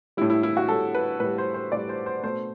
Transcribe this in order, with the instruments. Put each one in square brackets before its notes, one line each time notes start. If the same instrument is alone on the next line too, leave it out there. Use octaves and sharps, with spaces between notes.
[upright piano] G3 E4
A2
E4
E4
F#4
A2 G3 A4
B4
A2 G3 B4
C5
C5
A2 G3 D5
C5
C5
B2 A3 C5